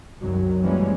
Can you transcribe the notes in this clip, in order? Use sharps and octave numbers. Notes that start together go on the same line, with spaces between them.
C2 F#2 D#3 F#3
E3 F3 G3 G#3 A#3 C#4